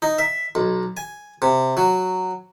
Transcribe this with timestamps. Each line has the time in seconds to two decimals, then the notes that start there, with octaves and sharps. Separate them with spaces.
0.02 D#4
0.18 E5
0.55 B1
0.97 G#5
1.42 C3
1.77 F#3